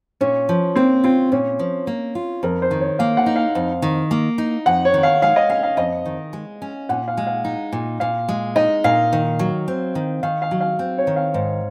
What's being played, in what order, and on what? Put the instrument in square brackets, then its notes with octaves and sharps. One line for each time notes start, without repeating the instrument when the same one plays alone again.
[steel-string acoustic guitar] A#2 [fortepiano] C#4
[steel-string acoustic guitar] F3
[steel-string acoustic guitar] A#3 [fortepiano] C4
[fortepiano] C4 [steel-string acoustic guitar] F4
[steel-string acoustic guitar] A#2 [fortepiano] C#4
[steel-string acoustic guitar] F3
A#3
F4
[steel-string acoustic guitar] F2 [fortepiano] A#4
[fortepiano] C5
[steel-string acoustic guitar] D#3
[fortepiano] C#5
[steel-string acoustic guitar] A#3 [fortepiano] F5
[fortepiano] F#5
[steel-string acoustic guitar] D#4
[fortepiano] F5
[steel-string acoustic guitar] F2
D#3
A#3
D#4
[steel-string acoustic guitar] F2 [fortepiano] F#5
[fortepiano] C#5
[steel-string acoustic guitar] D#3
[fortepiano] F5
[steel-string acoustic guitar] G#3 [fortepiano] F5
[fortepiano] D#5
[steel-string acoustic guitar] C#4 [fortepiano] F5
[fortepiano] F5
[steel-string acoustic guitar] F2 [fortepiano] D#5
[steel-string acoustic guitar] D#3
G#3
C#4
[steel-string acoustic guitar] A#2 [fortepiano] F#5
[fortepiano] F5
[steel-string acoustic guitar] G#3
[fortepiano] F5
[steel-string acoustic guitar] D#4
A#2
[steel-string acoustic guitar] A#2 [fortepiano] F5
[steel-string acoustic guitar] G#3
[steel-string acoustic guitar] D#4 [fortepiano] D#5
[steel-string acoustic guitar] A#2 [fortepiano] F5
[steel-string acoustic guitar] D#3
F#3
C4
D#3
[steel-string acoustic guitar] D#3 [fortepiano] F5
[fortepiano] F5
[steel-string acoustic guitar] F#3
[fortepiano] F5
[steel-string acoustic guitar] C4
[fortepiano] C#5
[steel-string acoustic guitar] D#3
[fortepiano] F5
[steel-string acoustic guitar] G#2